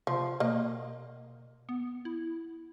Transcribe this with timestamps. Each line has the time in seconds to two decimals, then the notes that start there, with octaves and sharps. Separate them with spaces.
0.07 C3 F3
0.40 B2 A#3 D#5
1.69 B3
2.05 E4